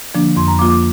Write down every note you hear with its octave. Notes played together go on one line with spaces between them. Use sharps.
D3 F3 A#3 D4
F2 C6
A#5
F3 A#3 F4 D6
D6